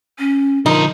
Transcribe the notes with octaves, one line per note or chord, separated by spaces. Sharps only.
C#4
D3 F3 D#4 A#4